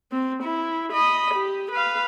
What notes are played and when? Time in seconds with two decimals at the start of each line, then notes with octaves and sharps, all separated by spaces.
0.12 C4
0.43 E4
0.92 D#5 B5
1.34 G4
1.72 B4 F5